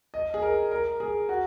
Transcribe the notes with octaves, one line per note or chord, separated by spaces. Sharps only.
D#5
G#4
A#4
A#4
G#4
F#4